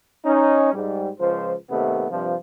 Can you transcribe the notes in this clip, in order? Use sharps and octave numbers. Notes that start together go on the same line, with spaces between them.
C#4 D#4
G#2 G3
C#2 F3 C5
D#2 C3 A3 B3
G2 C3 F3